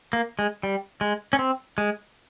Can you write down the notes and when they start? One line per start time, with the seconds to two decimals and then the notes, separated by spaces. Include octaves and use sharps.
0.13 A#3
0.39 G#3
0.63 G3
1.01 G#3
1.33 C#4
1.39 C4
1.78 G#3